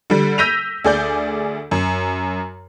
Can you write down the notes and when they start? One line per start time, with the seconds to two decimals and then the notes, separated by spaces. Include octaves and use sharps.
0.10 D3 G3
0.38 E6 G6 A#6 B6 D#7 F7
0.85 D2 G#4 D5 G6
1.71 F#2